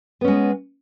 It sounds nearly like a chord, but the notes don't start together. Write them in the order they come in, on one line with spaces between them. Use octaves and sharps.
B3 C#4 G#3